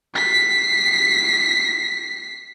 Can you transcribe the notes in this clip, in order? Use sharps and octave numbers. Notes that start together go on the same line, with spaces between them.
B6 C7